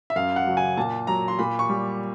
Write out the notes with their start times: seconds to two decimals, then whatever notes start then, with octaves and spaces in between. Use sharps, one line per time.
0.10 E5
0.16 F#2 F5
0.36 F#5
0.47 C#3 F#3
0.57 G#5
0.77 A#2 A5
1.07 F#3 A#5
1.28 C6
1.39 A#2 B5
1.59 C#6
1.69 G3